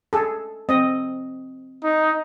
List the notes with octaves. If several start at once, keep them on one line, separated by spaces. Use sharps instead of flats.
G#4 A4
C4 D#5
D#4